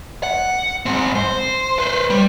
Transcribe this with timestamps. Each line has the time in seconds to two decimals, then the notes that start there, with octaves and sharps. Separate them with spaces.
0.23 F#5
0.86 G#2 C4
1.15 C5
1.79 B4 C5
2.10 G3